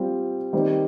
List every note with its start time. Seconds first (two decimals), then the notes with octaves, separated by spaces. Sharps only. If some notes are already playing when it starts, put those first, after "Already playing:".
Already playing: G3 C4 F4
0.53 D#3 G3 C4